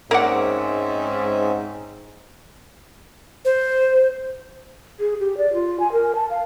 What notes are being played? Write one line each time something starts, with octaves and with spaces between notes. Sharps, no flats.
G#2 A#3 C4 C#4 D5 E5 F#5
C5
G#4
G4
D5
F4
G#5
A#4
A5
F5